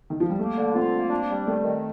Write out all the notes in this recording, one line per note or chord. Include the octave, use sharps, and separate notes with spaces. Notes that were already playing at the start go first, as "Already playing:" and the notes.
D#3
F3
G3
A3 A#3
D3
C4 F4
A#3
D4
G3
D#3 A3
D#3